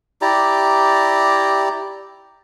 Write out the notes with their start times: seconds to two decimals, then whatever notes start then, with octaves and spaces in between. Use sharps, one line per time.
0.22 E4 G4 D5 A#5